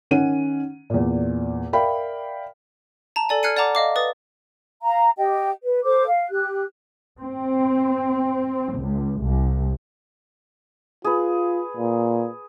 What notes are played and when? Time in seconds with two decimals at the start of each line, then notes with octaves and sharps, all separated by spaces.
0.11 D#3 C#4 F#5 D#7
0.90 E2 A#2
1.73 A#4 D5 E5 F5 G5 B5
3.16 A5 A#5
3.29 A4 D5 G#5
3.43 F6 F#6 G#6 C7 C#7 D#7
3.57 D5 F#5 A5 A#5 D6
3.75 D#5 F5 D6
3.96 B4 D#6 A6
4.83 F5 A#5
5.18 G4 D#5 G5
5.63 B4
5.84 A4 C5 D6
6.07 F5
6.30 G4 F#6
7.21 C4
8.76 C#2
9.21 C2
11.04 F4 G#4 B4
11.77 A#2